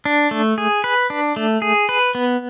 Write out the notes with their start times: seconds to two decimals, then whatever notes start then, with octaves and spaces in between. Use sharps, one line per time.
0.05 D4
0.31 A3
0.58 G#4
0.84 B4
1.10 D4
1.36 A3
1.62 G#4
1.89 B4
2.15 B3